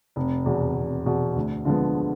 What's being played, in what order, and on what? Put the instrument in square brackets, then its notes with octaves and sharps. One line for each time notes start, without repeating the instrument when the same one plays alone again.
[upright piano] F1
E2 B2
F1
E2 B2
D2
D3 F3 G#3 B3